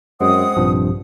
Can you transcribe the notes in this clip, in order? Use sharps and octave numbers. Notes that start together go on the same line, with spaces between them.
F#2 G#3 C4 F#5 D#6
A#1 G2 C3 F3